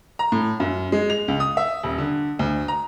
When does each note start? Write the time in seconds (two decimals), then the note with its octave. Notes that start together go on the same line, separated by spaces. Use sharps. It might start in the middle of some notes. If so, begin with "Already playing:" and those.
0.19 A#5
0.32 A2
0.60 F#2
0.92 G#3
1.10 F7
1.28 C#2
1.40 D#6
1.57 E5
1.83 D#1
1.98 D3
2.39 D2
2.68 A#5